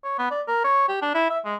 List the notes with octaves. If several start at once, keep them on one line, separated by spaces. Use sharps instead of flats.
C#5
B3
D5
A#4
C#5
G4
D4
E4
E5
G#3